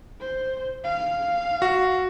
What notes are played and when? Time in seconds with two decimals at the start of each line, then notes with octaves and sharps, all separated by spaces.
0.20 C5
0.84 F5
1.62 F#4